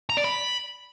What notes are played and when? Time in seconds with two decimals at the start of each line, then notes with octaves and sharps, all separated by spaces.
0.10 A#5
0.17 D5
0.25 B5